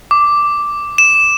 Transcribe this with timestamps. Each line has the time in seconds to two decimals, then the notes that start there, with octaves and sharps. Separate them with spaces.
0.11 D6
0.98 E7